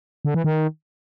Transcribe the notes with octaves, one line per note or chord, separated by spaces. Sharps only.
D3
E3
D#3